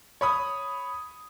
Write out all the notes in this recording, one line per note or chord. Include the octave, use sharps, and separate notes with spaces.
C#5 B5 D#6